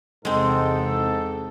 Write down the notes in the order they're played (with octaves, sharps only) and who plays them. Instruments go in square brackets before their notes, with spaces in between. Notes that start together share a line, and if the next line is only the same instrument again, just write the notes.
[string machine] E2 C3 G5 [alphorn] G#2 [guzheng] G#3 C4 [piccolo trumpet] A4